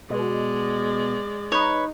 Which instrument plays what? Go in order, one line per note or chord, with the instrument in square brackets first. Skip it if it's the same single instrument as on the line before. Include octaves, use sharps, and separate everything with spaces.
[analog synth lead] B2 [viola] G#3 D5
[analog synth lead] D#4 [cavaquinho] B4 C#5